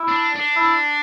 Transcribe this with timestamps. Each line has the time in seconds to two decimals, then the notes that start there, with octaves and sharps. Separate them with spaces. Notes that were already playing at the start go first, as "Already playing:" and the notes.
Already playing: E4
0.08 D4
0.36 D4
0.56 E4